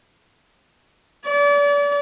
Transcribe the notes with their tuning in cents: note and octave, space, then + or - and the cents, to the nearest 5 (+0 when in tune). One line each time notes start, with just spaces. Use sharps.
D5 -35